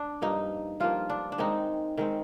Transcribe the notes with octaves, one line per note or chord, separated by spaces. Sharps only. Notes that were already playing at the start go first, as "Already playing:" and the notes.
Already playing: D4
G2 F3 A#3 D#4
G2 F3 A#3 F4
D4
D4
D#3 G#3 C4 D#4
D#3 G#3 C4